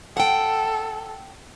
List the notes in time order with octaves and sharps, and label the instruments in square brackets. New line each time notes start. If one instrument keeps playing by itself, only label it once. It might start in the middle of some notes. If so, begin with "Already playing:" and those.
[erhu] A4 [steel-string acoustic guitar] F#5 G5